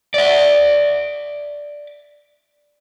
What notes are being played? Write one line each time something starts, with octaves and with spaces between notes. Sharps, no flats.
D5 E5